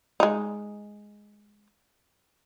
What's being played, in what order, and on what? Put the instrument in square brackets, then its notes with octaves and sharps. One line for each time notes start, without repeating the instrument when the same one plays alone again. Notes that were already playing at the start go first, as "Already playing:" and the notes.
[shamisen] G#3 D#4